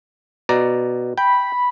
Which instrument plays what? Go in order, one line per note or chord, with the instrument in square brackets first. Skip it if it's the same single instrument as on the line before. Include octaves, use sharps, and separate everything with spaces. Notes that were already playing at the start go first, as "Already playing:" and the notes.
[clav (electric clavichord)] B2 D5 A#5
[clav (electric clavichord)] G5 [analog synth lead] B5